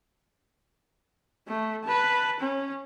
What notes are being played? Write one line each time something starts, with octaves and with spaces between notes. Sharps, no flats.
A3
B4 A5
C#4